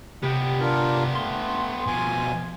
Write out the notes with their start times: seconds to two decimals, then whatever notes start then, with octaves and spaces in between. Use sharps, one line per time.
0.23 C3 B3 G4
0.60 D4 F4 A#4
1.15 A3 C6
1.87 B2 F3 G#5